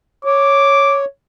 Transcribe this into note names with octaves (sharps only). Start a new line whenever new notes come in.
C#5 D6